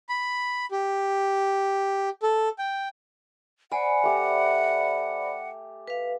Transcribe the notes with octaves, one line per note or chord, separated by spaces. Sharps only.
B5
G4
A4
G5
C5 D5 F#5 G#5 B5
A3 G4 D6
B4 F5